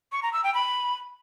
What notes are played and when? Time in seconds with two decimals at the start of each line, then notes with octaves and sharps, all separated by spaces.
0.12 C#6
0.23 A#5
0.33 E6
0.44 G5
0.54 B5